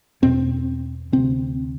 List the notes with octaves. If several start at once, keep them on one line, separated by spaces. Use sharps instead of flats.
E2 B2 C4
D2 C3 C4